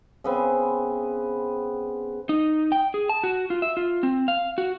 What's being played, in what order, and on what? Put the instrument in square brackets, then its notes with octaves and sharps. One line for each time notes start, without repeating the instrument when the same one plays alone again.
[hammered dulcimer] C#3 B3 C4
[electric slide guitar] D#4
G5
G#4
A5
F#4
F4
E5
F4
C4
F5
F#4